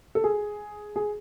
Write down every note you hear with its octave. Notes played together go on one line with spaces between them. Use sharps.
A4
G#4
G#4